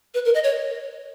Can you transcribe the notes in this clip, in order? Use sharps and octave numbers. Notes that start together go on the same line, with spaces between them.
B4
A#4
D#5
C#5